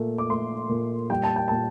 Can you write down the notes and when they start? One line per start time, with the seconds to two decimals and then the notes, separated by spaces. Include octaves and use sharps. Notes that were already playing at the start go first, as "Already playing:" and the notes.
Already playing: A#2 A3
0.18 D6
0.29 A3 C6
0.69 A#2
1.10 G3 G5
1.23 A5
1.36 G5
1.48 A#2 A5